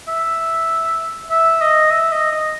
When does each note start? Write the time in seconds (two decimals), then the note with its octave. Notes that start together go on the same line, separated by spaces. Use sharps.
0.08 E5
1.31 E5
1.61 D#5
1.91 E5
2.12 D#5
2.32 D#5